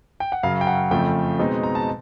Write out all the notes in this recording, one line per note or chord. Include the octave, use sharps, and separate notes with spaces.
G5
F#5
F#2 C#3 F#3 F5
G5
F#5
F2 C#3 F3 A3 G5
B2 G#3 C4 D#4
A#5
A5